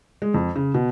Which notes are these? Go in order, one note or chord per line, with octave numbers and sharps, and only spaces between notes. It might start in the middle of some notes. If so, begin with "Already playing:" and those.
G#3
F2
C#3
B2